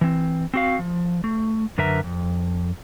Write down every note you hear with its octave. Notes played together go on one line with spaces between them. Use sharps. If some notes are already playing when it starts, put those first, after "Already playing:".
E3 C4
C4 F#4 F5
F3
A3
F#2 D3 A#4 B4 E5 A#5
F2